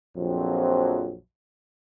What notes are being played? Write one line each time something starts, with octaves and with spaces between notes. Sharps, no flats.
A#1 F2 F#3 C4